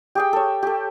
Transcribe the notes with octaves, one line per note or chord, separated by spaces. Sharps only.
G4 G#4 G5
A4 C#5
G4 A4